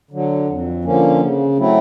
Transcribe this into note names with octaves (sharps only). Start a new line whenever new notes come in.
D3 F#3
F2
D3 F3 A#3 C#4
C#3
F#3 A3 C4 E4